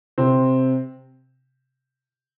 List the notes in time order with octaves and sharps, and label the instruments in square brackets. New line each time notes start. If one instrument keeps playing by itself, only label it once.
[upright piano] C3 C4